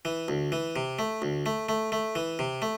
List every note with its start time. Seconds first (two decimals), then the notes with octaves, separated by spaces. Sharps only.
0.05 E3
0.28 D2
0.52 E3
0.76 C3
0.99 A3
1.22 D2
1.46 A3
1.69 A3
1.92 A3
2.15 E3
2.39 C3
2.62 A3